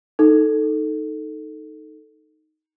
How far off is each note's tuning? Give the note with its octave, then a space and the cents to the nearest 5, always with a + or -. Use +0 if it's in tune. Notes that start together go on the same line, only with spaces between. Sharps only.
D#4 +0 A4 +0